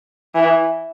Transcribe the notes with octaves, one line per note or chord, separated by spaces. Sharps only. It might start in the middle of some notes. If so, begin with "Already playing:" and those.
E3